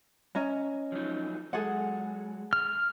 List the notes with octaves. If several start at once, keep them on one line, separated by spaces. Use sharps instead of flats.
C#4 D#5 A#5
F3 F#3 D#4
F#3 G#3 G#4 A4 F#5
F6